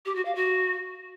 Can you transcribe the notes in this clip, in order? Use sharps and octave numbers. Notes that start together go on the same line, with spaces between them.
G4
F#4
F5
F#4